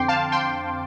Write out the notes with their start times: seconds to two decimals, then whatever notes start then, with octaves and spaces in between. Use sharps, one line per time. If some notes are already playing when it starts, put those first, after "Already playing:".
Already playing: F2 D3 C4 G5 C6 D6
0.08 F5 A5
0.32 G5 C6